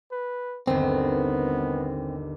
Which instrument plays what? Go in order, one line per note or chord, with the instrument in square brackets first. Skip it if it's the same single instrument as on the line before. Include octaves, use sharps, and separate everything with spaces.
[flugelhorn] B4
[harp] G1 D#2 [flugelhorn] B3 [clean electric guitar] C4